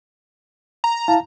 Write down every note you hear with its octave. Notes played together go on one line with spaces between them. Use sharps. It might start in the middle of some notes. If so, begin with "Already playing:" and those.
A#5
E4 F5 A5